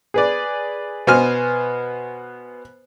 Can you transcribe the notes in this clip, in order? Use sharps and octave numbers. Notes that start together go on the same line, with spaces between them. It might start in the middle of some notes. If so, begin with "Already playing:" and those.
G#4 B4 D5
B2 B3 C5 G#5 F6